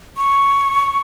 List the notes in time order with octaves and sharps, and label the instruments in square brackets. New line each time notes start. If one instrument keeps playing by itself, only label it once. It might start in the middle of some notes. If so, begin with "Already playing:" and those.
[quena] C#6